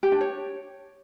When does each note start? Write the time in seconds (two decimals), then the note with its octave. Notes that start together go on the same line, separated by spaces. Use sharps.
0.03 G4
0.12 D4
0.21 C#5